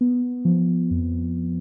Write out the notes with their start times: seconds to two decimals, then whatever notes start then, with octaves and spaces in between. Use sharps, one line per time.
0.01 B3
0.45 F3
0.91 F2